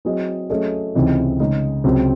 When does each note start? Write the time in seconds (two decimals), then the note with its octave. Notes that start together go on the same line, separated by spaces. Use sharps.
0.05 F#3 C4 E4 G#4 D#5
0.50 F#3 A3 C#4 G#4 D#5
0.95 C#2 C3 E3 C4 D#4
1.40 C#3 G#3 D#4
1.84 C#2 C3 F#3 C4